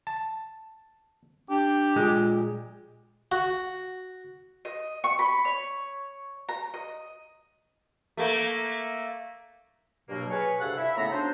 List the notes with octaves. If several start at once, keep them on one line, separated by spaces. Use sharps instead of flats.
A5
D4 G4
A#2 G#3
F#4
D#5
C#6
B5
C#5
A#5
D#5
A3 A#3
G2 B2 F#3 A#3
G#4 B4 C#5
D2 G2 C3 A4 F5 F#5
E4 E5
A2 C#3 A3 B3 F#5 A#5
F#3 D4 D#4 C5